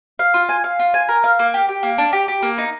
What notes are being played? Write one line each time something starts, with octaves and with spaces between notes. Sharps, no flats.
F5
F4
G#5
F5
F4
G#5
A#4
F5
A#3
G4
G4
A#3
D4
G4
G4
A#3
D#4